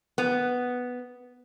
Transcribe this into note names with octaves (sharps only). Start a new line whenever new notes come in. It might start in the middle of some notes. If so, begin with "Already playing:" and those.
B3